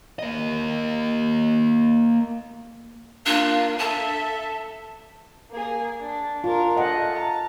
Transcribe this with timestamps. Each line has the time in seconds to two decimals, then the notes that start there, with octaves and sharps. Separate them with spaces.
0.19 A#3 D#5
3.26 A#3 D4 F4
3.79 A4 E5 A5
5.50 A#3 G#4
6.00 D4
6.44 D4 F4 A#4
6.77 G#3 A3 D#5 F#5
7.14 A5 A#5